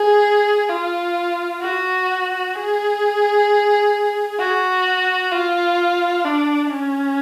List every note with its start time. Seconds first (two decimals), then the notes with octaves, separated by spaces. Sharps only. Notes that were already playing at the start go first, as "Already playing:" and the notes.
Already playing: G#4
0.70 F4
1.61 F#4
2.55 G#4
4.39 F#4
5.32 F4
6.24 D4
6.70 C#4